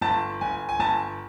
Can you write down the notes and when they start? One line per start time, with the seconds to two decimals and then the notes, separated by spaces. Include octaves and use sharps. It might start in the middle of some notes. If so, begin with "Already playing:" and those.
0.01 G1 A5
0.41 G1 G#5
0.69 G#5
0.80 G1 A5